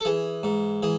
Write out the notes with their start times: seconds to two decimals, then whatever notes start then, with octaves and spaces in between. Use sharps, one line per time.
0.01 A4
0.05 E3 G#4
0.43 G#2
0.82 E3 G#4